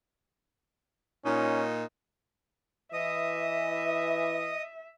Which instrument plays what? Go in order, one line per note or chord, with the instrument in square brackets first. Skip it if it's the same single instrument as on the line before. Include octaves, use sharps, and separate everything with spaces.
[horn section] A#2 D#4 [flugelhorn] C#4
[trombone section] E3 [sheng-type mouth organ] D#5 D#6 [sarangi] E5